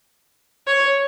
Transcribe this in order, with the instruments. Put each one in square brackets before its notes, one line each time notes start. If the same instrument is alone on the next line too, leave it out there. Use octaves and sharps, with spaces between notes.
[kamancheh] C#5